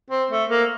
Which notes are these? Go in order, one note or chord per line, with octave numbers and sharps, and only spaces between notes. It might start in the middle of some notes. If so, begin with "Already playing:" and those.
C4
A3
A#3